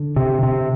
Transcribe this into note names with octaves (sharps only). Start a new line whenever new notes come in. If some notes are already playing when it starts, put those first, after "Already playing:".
Already playing: D3
C3
C3